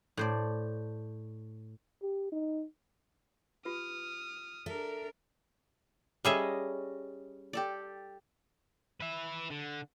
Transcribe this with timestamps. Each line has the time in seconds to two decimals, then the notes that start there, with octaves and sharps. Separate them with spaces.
0.17 A2 C5 D5
2.02 G4
2.32 D#4
3.65 F4 G4 B4 D#6 F6
4.66 D4 A4 A#4 E5
6.25 G3 C#4 G#4 A4 D#5 E5
7.53 G4 A4 D5
9.00 B4 E5
9.50 D3